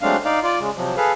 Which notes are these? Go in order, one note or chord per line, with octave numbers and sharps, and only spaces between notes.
F#3 G#3 A3 C4 D4 F5
D#4 D5 F5
F4 D5
C#3 G#3
C3 F3 F#3
G#4 A4 B4 F5